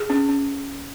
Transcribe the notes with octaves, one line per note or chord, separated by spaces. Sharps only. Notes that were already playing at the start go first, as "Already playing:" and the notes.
Already playing: G#4
C#4
C#4